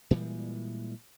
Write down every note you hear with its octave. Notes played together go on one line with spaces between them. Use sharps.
A#2 E3 G3 G#3